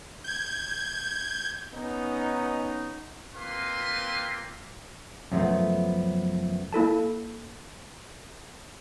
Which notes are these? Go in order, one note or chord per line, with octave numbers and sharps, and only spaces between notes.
G6 G#6
B3 C#4 D#4
A#3 C4 F4 B4 C6
F#2 C#3 F3 G#3 A3 B3
A#3 E4 A4 A5